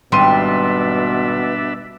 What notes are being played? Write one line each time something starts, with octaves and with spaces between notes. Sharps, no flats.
G#1 B2 G3 D4 B4 E5 C6 D#7